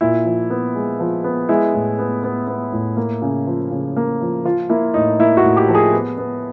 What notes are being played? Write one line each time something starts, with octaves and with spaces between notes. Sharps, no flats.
A#2 E4
F3
B3
G#3
F3
B3
G#3 E4
A2
B3
B3
B3
A2
A#3
C#3
F3
C#3
A#3
F3
F3 F4
A#3 E4
A2 D#4
A#3 E4
F#4
A2
G4
F3
G#4
B3
B3